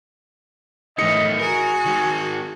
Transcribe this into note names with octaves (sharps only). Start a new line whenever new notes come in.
A2 D#3 E3 A3 D#5 C#7
F#4 G#4 A#4
D#3 G#3